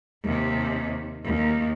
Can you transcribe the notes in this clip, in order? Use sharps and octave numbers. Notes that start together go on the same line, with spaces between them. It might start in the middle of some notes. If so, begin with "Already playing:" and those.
D#2 C3
D#2